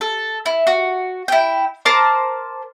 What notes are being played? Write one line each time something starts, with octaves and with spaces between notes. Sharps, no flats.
A4
E4
F#4
E4 G5
A#4 C5 A5 D6